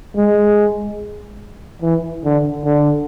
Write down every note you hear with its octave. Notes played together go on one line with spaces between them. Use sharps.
G#3
E3
D3
D3